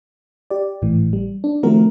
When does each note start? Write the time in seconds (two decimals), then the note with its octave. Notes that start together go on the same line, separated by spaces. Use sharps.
0.50 G4 D5
0.82 G#1 A2 E3
1.13 G3
1.44 D4
1.63 D#3 F3 A3 C4 F#4 A#4